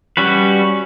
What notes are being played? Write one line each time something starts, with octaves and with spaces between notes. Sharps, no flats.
G3 C#4 F#4 B4